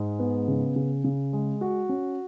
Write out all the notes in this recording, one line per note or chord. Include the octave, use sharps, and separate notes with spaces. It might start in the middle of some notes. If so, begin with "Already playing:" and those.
Already playing: G#2 G#3
B3
C#3
C#3
C#3
G#3
F#4
C#4